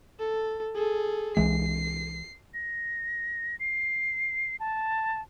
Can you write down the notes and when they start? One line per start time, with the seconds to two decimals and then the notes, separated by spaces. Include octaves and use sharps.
0.20 A4
0.75 G#4 A4
1.37 C2 E3 G#3 C7
2.53 A#6
3.60 C7
4.60 A5